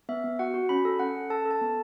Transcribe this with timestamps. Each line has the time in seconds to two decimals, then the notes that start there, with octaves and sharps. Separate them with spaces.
0.09 B3 E5
0.24 B3
0.39 F#4 F#5
0.54 F#4
0.69 C#4 B5
0.85 A4
0.99 C#4 F#5
1.15 A4
1.30 A4 A5
1.45 A4
1.51 A5
1.61 B3